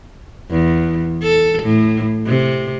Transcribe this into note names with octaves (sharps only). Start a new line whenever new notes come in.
E2
A4
A2
C3